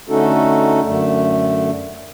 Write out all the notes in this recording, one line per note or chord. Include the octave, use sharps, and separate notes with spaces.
D3 A3 C#4 D#4 F#4 A4
F#2 D3 A3